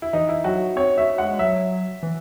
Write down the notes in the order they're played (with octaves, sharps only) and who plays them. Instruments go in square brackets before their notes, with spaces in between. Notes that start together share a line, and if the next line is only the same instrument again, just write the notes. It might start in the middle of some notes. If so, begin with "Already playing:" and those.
[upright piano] E4
[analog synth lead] E3 [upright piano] D#4
[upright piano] E4
[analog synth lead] F#3 [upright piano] F#4
[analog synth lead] C4 [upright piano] C#5
[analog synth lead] A3 [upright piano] E5
[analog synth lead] G#3 [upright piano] F#5
[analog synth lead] G#3
[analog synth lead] F#3 [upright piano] E5
[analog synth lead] E3